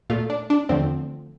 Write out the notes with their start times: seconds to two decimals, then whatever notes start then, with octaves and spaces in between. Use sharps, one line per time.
0.10 A#2 A3 F4
0.30 D4
0.50 D4
0.69 E2 D3 F3 A3 C4